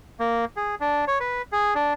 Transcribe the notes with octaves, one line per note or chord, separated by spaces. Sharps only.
A#3
G#4
D4
C#5
B4
G#4
D4